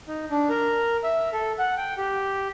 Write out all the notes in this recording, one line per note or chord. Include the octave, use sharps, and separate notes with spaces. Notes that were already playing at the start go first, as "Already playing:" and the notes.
D#4
D4
A#4
E5
A4
F#5
G5
G4